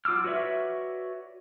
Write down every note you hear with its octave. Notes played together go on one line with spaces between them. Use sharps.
F#3 F4 D6 E6 F6
F#4 B4 C#5 D5 E5